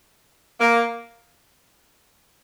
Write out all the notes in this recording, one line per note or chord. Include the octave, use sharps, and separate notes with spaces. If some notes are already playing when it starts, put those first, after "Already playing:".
A#3